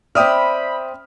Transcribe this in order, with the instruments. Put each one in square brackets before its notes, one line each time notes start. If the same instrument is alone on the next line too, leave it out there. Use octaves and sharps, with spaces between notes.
[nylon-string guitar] C4 D5 [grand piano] E5 [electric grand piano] G5 D#6 F6 [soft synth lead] B5